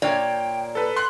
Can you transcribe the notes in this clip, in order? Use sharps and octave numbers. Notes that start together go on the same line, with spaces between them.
A#2 C#5 D5 G5
A4 B4
C6 F#6